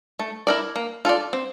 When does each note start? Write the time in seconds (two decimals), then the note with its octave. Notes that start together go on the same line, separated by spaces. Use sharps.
0.19 A3
0.47 E4 A#4 D5
0.76 A#3
1.05 F4 A4 D5
1.33 C4